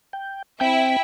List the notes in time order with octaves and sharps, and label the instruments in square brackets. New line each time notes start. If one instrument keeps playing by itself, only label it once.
[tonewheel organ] G5
[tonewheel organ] C4 [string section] E4 E5 [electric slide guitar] G5